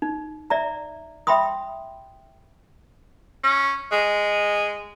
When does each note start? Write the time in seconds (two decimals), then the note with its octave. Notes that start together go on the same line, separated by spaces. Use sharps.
0.02 D#4
0.50 D5 E5 A#5
1.27 E5 G5 B5 C6 D#6
3.44 C#4
3.92 G#3